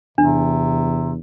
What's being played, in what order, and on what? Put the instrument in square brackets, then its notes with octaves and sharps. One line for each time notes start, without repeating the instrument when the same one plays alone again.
[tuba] E2 [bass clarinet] C3 [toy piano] D4